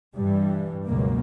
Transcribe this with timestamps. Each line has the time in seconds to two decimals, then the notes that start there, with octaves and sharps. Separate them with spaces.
0.15 G2 E3 G3
0.86 C#2 F#2 B2 A#3